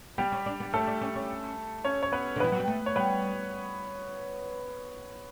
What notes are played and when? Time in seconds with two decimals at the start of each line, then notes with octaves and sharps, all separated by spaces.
0.18 G3 B3 G4
0.32 C#4
0.46 D4
0.60 B3
0.73 A3 C#4 A4
0.87 D4
1.01 C#4
1.15 C#4
1.85 C#4 C#5
2.03 C#5
2.12 B3 B4
2.36 D3
2.40 E3 B3 B4
2.52 F#3
2.60 G3
2.68 A3
2.86 C#5
2.96 G3 B3 B4